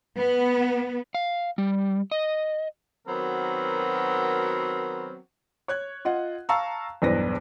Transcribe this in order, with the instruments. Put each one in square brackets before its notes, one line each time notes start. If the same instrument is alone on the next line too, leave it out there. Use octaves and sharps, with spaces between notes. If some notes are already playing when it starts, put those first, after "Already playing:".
[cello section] B3
[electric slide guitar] F5
G3
D#5
[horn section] D#3 F#3 B3 C4 F#4 A#4
[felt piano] C#5 F#6 G#6
F4 D#5 F#5
F5 A5 A#5 C#6 E6
B1 E2 G2 B4 C5 A#6